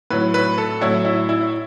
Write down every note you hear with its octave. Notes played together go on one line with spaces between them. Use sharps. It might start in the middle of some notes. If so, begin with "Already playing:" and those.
A2 F#3 B4
B4
A4
A2 F#3 E4
E4
E4